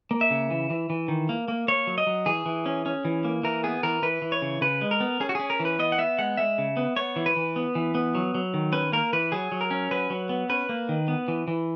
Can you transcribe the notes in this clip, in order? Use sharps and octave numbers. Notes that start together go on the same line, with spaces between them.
A#3
E5
C#3
E3
E3
E3
D#3
A#3
A#3
A#3 C#5
F#3
D#5
F#3
E3 G#4
E3
C#4
C#4
E3
A#3
E3 A#4
B3 G#4
E3 A#4
E3 B4
E3
C#5
C#3
C#3 B4
G#3
A#4
B3
C#4 G#4
F#4
C#4 G#4
A#4
E3
B4
B3 D#5
F#5
B3 E5
G#3 F#5
G#3 E5
C#3
B3
B3 C#5
E3
B4
E3
B3
E3
B3
F#3
F#3
D#3
C#4 B4
A#3 A#4
E3 B4
F#3 G#4
F#3
A#4
C#4
F#3 B4
F#3
B3
C#4 B4
A#3
D#3
B3
E3
E3